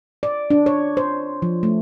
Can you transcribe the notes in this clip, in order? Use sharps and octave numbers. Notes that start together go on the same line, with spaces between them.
D5
D4
C#5
C5
F3
A3